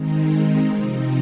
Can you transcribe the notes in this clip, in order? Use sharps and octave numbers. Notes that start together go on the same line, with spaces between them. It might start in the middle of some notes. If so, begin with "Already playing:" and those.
Already playing: D#3 G#3 C4 D#4
C3 F3 C4 D#4